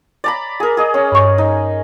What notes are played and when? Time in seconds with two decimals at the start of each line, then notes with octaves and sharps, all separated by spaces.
0.24 D5 A#5 B5
0.60 G#4 A#4
0.77 G#4 D#5
0.94 C#4
1.12 G2 C#6
1.38 D#4